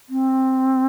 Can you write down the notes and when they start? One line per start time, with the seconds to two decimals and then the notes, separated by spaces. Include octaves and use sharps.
0.09 C4